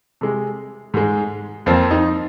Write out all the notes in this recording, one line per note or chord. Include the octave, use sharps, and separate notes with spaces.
C3 G#3
G#2 G#3
F2 F3 A#3 C4
D#4